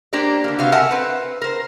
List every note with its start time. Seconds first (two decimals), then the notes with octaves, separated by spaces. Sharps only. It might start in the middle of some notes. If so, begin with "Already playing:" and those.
0.13 A#3 D4 G4 A#4 C5 D5
0.44 D3 A#3
0.59 C3 G3 B3 F#4 F5
0.72 A4 A#4 E5 F#5 G#5 A5
0.91 C4 B4
1.41 A#4 C5